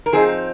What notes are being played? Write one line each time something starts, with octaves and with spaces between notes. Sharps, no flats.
A#4
F3 C4 D#4 G#4